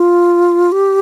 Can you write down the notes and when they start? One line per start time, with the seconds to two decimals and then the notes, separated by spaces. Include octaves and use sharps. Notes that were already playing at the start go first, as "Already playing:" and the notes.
Already playing: F4
0.72 G4